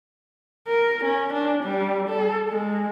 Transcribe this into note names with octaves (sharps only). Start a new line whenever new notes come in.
A#4
C#4
D4
G3
A4
G#3